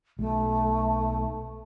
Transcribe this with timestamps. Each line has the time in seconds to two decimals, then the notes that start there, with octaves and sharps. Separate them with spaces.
0.19 B1 A3